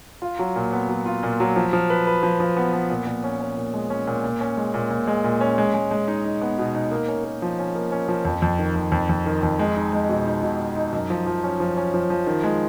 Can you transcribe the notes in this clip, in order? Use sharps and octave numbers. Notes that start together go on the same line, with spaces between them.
F4
F#3
A#2
B3
F#3
F4
A#2
F#3
F3
F3
B4
B4
F3
F3
B3
B3
A#2
A#2
C#4
C#4
A#2
G#3
C#4
A#2
A#2
C#4
G#3
A#2
A#2
G#3
A#2
C#4
G#3
G#3
G#3
D#4
D#4
B3
B2
D#4
A#3
C#4
A#3
F3
C#4
A#3
C#4
F3
F2
F2
D#3
F2
F2
F2
D#3
F2
G#3
D#4
G#3
B2
D#4
B2
D#4
D#4
F#2
F3
F3
C#4
F3
C#4
F3
F3
D#3
G#3